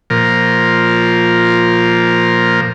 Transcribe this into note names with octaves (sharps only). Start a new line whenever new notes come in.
A#2 F3 A#4